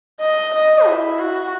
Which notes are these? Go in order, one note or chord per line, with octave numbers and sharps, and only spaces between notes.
D#5
D#5
E4
F#4